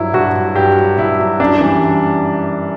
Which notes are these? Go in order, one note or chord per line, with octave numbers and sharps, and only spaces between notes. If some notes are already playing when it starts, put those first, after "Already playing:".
Already playing: G2 F#3 E4
G2 F#4
F#3
G2 G4
F#3
G2 E4
F#3
F#2 D4
E3 G3